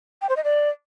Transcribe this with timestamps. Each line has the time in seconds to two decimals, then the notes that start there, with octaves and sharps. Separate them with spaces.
0.22 G5
0.29 C5
0.37 D#5
0.44 D5